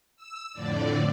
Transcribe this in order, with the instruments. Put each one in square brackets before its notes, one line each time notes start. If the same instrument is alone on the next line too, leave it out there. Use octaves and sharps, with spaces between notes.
[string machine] E6
F2 A2 D3 D5